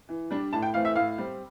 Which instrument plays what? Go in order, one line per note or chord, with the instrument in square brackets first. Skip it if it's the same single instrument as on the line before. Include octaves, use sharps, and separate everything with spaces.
[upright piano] E3
G3 D4
A2 A5
G5
E3 A3 C4 F5
E5
A2 F5
G3 C4